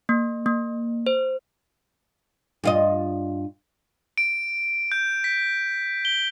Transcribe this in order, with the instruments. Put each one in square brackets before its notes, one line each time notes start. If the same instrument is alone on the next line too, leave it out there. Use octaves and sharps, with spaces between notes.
[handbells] A#3
A#3
C5
[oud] G2 F4 D#5
[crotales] D7
G6
B6
G7